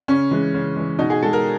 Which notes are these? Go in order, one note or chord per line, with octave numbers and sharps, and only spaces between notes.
C#3 C#4
E3 G#3
C#3
E3 G#3
B2 D#4
G#4
G#3 A4
A#4